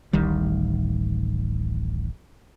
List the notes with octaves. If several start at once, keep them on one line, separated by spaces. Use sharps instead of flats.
D1 A1 D#3 G3